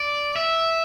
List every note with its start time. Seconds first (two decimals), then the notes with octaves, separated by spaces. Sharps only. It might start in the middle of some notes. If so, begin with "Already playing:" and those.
Already playing: D5
0.36 E5